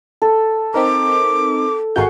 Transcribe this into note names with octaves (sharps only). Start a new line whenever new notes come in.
A4
C4 D#4 A#4 D6
G#1 F#4 G#4 A#4 F5 C#6 G6